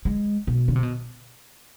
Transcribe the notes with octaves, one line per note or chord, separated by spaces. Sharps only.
G#3
B2
D3
C3
B2